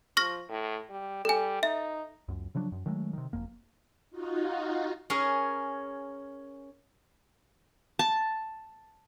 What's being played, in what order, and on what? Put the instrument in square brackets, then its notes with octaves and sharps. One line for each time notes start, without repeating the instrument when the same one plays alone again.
[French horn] F3 [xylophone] C#6 F6 A#6
[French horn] A2
G3
[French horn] G3 [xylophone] A4 G#5
[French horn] D#4 [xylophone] E5
[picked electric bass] C#2 F#2
C#3 F3 F#3 D4
F#2
D#3 F#3 G#3 A3
C3 D#3
F#1 F2 A#3
[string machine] D#4 F4 F#4
[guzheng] C#4 G#4 A#4
[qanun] A5